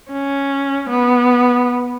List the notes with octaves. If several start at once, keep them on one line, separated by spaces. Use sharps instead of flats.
C#4
B3